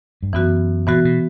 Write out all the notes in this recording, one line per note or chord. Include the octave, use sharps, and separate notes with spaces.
G2
F#2 E3 B3 F#4
A#2 E3 B3 F#4
B2